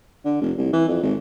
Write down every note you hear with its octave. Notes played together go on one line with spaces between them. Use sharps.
D3
F1
C2
E3
F2
G#1